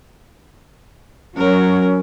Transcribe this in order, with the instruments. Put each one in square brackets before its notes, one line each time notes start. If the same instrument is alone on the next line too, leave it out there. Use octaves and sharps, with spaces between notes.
[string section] F#3 [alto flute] C#4 [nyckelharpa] A#4